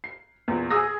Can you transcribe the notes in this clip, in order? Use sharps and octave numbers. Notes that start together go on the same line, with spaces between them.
C7
E2 A#2
G#4 D#6 E6 A#6